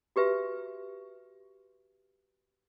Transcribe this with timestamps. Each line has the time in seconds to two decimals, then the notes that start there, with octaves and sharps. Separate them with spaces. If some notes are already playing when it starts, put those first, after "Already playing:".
0.16 F#4 G4 B4 E5